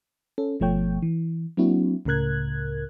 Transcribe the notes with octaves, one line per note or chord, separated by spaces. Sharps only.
C#4 A4
G1 B2 F3 A3 C#5 G5
E3
F#3 A#3 C4 D4 E4 F#4
C#2 A2 C#3 A#4 F#6 G#6